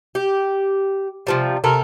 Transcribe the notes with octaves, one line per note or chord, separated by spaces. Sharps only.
G4
C3 F3 G3
C3 A4 A#4